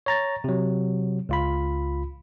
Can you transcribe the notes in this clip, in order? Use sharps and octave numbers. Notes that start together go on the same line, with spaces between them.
C#5 A#5 A6
C3 F#3
C#2 F4 B5